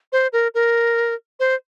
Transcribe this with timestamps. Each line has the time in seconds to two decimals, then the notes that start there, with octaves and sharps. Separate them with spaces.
0.12 C5
0.33 A#4
0.54 A#4
1.40 C5